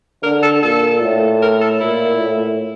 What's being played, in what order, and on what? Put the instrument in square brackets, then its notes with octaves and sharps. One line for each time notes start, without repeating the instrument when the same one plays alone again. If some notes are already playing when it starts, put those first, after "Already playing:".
[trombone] D3 [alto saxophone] A#4
[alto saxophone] A4
[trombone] A#2 [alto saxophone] A4
[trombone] A2
[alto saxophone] A#4
A4
[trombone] A#2 [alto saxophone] E4
[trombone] A2